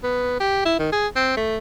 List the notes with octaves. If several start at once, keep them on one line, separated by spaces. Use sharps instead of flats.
B3
G4
E4
D#3
G#4
C4
A3